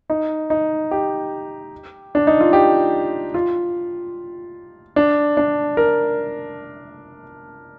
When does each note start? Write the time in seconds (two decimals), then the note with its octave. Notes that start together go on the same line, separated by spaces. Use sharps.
0.10 D#4
0.50 D#4
0.91 G4
2.15 D4
2.27 D#4
2.40 F4
2.53 G4
3.34 F4
4.96 D4
5.37 D4
5.77 A#4